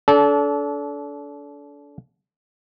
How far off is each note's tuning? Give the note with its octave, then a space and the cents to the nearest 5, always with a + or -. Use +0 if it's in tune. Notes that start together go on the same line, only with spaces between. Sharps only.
D4 -35 A4 -20